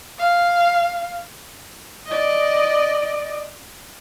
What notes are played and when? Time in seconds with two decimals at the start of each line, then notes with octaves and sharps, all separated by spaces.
0.19 F5
2.06 D5 D#5